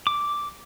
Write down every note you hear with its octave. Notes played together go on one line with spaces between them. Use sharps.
D6